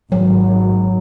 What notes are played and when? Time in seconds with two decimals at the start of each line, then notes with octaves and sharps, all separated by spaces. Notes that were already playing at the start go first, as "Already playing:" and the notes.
0.12 G#1 F#3